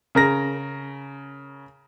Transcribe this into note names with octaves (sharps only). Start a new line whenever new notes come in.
C#3 A#4 A#6